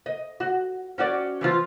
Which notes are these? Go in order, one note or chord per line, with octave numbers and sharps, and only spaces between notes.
D#5
F#4
C#4 F#4 D5
E3 F3 F4